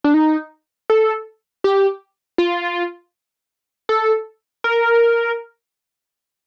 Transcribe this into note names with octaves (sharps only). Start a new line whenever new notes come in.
D4
D#4
A4
G4
F4
A4
A#4